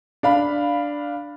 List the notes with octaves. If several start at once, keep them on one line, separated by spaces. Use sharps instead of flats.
D4 F5 B5